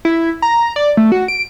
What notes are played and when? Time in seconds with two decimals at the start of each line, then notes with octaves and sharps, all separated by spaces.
0.05 E4
0.42 A#5
0.76 D5
0.97 A3
1.12 F#4
1.28 D7